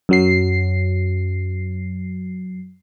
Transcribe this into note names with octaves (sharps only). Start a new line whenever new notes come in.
F#2 F#3 C7